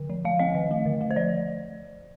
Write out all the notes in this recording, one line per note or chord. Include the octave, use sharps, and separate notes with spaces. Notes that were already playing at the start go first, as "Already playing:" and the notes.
Already playing: D3
F3
F3 F5
C4 D#5
D#3
A3
D3
A3
C5
F3 D5